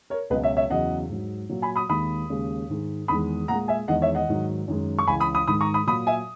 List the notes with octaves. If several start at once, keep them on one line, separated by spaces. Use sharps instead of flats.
A#4 C#5
C#2 B2 F#3 B4 D#5
C#5 E5
C#5 E5
E2 C#3 F#3 D#5 F#5
G#2 F#3
A#2 F#3
G#5 B5
B5 D#6
D#2 D#3 G#3 B5 D#6
D#2 C#3 G#3
G#2 D#3 G#3
E2 D#3 G#3 B5 D#6
A#2 G#3 F#5 A#5
E5 G#5
E2 D#3 G#3 D#5 F#5
C#5 E5
D#5 F#5
G#2 D#3 F#3
F#2 D#3 G#3
C#6
C#2 C#3 E3 G#5 B5
B5 D#6
B5 D#6
G#2 D#3 G#3 B5 D#6
A#5 C#6
B5 D#6
A#2 F#3 B5 D#6
E5 G#5